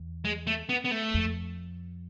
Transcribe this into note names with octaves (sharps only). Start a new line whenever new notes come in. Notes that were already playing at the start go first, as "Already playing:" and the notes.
Already playing: E2
G#3
A3
B3
B3
A3
F2